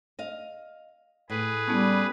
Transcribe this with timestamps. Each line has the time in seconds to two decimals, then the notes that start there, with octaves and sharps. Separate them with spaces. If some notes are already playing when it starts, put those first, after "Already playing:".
0.19 D#5 F5
1.30 A2 G#4 B4
1.67 G3 B3 C#4 E4